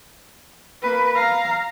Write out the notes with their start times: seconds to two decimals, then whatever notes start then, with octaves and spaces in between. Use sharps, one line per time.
0.82 A#3 B4
1.15 F5 A#5